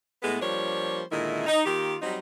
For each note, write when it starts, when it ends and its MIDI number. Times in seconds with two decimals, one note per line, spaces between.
0.23 0.40 45
0.23 0.40 56
0.23 0.40 57
0.23 0.40 59
0.42 1.02 53
0.42 1.02 55
0.42 1.02 58
0.42 1.02 62
0.42 1.02 72
0.42 1.02 73
1.12 1.45 46
1.12 1.45 50
1.12 1.45 51
1.12 1.45 56
1.12 1.45 64
1.47 1.61 63
1.66 1.96 51
1.66 1.96 58
1.66 1.96 65
1.66 1.96 67
2.02 2.19 54
2.02 2.19 55
2.02 2.19 60
2.02 2.19 63